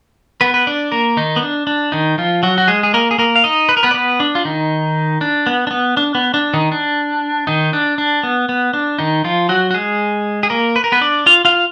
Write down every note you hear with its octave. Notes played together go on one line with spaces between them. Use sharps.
B3 B4
B4
D4 D5
A#3 A#4
D#3 D#4
B3
D4
D4
D#3 D#4
F3 F4
F#3 F#4
F#4
G#3 G#4
G#4
A#3 A#4
G#4
A#3 A#4
F5
D#4 D#5
B4
A#4
B3 B4
D5
B3 B4
D4
F4
D#3 D#4
D4
B3
D4
B3
D4
B3
D4
D#3 D#4
D4
D#3 D#4
D4
D4
B3
B3
D4
D#3 D#4
F3 F4
F#3 F#4
F#4
G#3 G#4
G#4
A#3 A#4
B4
A#4
B3 B4
D4 D5
F4 F5
F4 F5